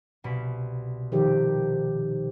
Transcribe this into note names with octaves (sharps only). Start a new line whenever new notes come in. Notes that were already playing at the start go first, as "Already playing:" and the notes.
C2 B2 B5
D#3 F3 G4